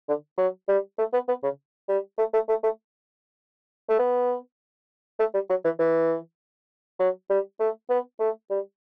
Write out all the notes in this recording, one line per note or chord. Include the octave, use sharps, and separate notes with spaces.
D3
F#3
G3
A3
B3
B3
C#3
G3
A3
A3
A3
A3
A3
B3
A3
G3
F#3
E3
E3
F#3
G3
A3
B3
A3
G3